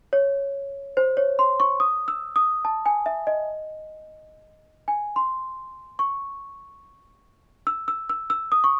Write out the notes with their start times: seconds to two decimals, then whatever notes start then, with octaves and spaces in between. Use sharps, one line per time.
0.13 C#5
0.97 C5
1.17 C#5
1.39 C6
1.60 C#6
1.80 D#6
2.08 E6
2.36 D#6
2.65 A5
2.86 G#5
3.06 E5
3.27 D#5
4.88 G#5
5.16 C6
5.99 C#6
7.67 E6
7.88 E6
8.09 E6
8.30 E6
8.52 D#6
8.64 C#6